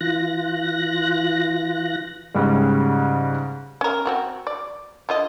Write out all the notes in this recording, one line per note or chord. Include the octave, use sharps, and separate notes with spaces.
E3 F4 F#6 A#6
G#2 C#3 G3
C#4 A#4
C4 F#4 A#4
D5
D3 F4 D#5